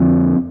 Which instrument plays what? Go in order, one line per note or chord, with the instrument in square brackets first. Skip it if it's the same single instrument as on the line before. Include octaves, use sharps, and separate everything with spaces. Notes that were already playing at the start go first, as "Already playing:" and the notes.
Already playing: [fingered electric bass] F2 D3 F3 C4